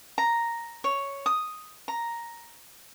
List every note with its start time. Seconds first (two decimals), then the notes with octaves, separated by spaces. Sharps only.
0.18 A#5
0.84 C#5
1.26 D#6
1.88 A#5